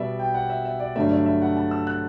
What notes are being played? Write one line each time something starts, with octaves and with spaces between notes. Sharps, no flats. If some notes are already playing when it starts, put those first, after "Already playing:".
Already playing: B2 G3 B3 D5 E5
G5
F#5
E5
E5
D5
G2 D3 F#3 A3 E5
D5
E5
F#5
A5
E6
F#6